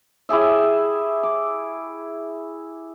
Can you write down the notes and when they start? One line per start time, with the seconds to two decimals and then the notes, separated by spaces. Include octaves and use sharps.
0.29 E4 G4 G#4 E5
1.23 D6